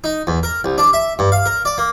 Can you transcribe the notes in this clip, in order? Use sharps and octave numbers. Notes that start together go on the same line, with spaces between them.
D#4
E2
A#4
C2
D4
E5
G2
F5
A#4
D5
A#3